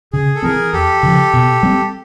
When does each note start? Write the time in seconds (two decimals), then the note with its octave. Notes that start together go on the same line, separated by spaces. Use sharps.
0.13 C#3 G#4
0.35 A4
0.42 E3 G3 C4 G#4 A#4
0.73 E2 G4 A4
1.03 C#3 F3
1.34 B2
1.63 G3 C4